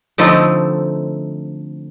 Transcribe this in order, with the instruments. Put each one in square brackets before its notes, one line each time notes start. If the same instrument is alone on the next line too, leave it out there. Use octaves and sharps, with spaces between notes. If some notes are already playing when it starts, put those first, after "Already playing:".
[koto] D3 F3 A3 C4 D#4